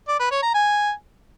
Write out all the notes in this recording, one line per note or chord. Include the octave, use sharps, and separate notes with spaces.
D5
B4
C#5
A#5
G#5